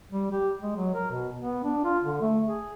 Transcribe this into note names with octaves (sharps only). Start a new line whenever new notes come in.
G3
G4
G#3
F#3
A#4
B2
B3
D4
F4
D3
A3
G#4